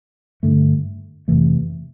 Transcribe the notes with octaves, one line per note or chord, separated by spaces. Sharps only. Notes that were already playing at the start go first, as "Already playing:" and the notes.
G2 D3 A3
F2 C3 E3 A3